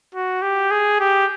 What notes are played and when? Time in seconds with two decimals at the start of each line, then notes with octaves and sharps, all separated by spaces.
0.15 F#4
0.42 G4
0.71 G#4
1.00 G4